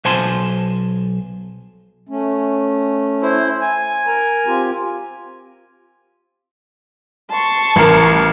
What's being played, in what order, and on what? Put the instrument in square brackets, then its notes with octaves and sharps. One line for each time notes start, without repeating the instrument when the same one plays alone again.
[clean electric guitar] B1 C5 G#5 A5 C6
[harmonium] A3 C#4
[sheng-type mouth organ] E4 C5
G#5
[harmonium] A#4 A#5
C4 F4 G4
[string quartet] A5 C6 C#6
[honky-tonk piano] A1 A#4